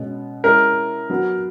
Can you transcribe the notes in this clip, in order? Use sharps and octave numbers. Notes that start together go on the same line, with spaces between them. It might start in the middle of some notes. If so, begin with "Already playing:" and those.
Already playing: B2 G#3 C#4
G#3 C#4 E4 G#4 A#4
F#3 B3 F#4